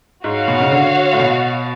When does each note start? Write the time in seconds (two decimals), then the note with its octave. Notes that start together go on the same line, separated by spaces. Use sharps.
0.24 G#2 F#4 C#5 F5
0.48 B2
0.60 C#3
0.71 D3
1.13 A2
1.19 B2